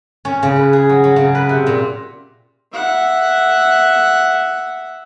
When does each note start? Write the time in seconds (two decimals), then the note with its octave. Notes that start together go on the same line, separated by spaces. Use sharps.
0.25 C#4
0.43 C#3
0.56 B4
0.73 G#4
0.89 F#3
1.04 F#3
1.16 C#3
1.35 B4
1.49 C3
1.67 A#2
2.74 E5 F#5